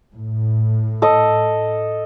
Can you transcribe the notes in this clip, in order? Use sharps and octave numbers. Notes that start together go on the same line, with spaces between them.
A2
A4 D#5